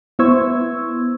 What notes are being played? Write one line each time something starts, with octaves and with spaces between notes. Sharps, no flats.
B3 E4 C5 C#6 E6 G#6